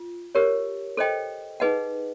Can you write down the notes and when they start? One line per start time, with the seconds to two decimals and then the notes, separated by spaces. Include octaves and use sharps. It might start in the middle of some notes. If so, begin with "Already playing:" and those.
Already playing: F4
0.35 G4 A#4 C#5
0.97 A4 C5 D#5 G5
1.60 D#4 G#4 B4 D#5 F#5